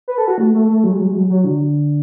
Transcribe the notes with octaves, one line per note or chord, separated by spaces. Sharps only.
B4
A4
F#4
A3
A3
A3
F#3
G#3
F#3
G#3
F#3
F#3
D3